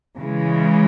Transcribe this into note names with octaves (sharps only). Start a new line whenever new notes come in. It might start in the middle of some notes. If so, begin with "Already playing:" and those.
C#3 E3 G#3